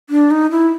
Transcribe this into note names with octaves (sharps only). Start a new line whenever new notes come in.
D4
D#4
E4